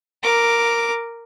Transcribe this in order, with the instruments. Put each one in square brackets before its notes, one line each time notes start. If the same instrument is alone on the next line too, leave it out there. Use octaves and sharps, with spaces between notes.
[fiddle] A#4 D6